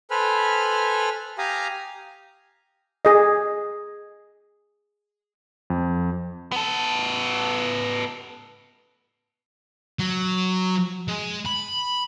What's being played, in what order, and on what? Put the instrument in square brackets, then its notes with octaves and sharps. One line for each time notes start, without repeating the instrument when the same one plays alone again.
[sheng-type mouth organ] A4 B4 C5 G#5 B5 F6
G4 F5 G#5 A#5 D#6
[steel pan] G#4 D#5
[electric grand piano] F2
[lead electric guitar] B3 A4
[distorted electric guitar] F#3
G#3
B5